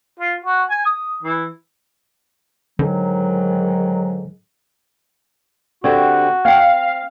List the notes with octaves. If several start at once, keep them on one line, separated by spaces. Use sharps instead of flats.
F4
F#4
G#5
D#6
E3
G#2 D3 D#3 F#3
D3 C4 F#4 G4 D5 C#6
C4 D5 F5 G5